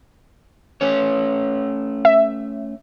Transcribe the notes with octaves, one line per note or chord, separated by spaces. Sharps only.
A3 C#4 C#5
E5